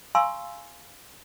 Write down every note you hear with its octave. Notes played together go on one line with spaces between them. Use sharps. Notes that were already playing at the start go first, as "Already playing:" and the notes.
F5 G#5 A#5 C6 C#6 E6